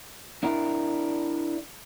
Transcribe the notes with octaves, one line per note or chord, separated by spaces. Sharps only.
D4 E4 A#4